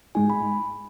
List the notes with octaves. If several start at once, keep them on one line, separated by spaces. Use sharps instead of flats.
G#2 G#3 D#4 G#5
B5